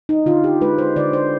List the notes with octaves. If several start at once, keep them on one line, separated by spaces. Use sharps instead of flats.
D#4
D3 F4
G4
G#3 B4
C5
D3 D5
C5